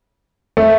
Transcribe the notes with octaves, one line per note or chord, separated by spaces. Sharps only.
A3